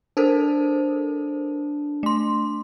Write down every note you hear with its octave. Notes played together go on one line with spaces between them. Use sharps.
D4 A4 A#4 C5
A3 C6